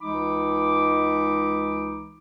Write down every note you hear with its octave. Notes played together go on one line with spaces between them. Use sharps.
C#2 E3 G#3 D#4 B5 D6